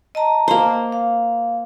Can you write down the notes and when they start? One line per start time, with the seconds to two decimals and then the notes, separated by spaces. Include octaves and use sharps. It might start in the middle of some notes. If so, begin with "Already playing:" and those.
0.15 D#5 A5 A#5
0.48 A#3 C5
0.92 F5